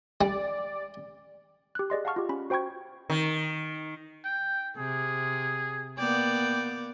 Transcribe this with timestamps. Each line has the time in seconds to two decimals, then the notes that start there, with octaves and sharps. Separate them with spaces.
0.21 G3 D5
1.75 G4 F#6
1.90 G#4 D5 D#5 C6
2.05 F5 F#5 A5 C#6 F6
2.16 F4 G4
2.29 C#4 B5
2.50 F#4 C5 G5 B5 C#6 G#6
3.10 D#3
4.25 G5
4.77 C3 G#4
5.98 A#3 B3 D5 G5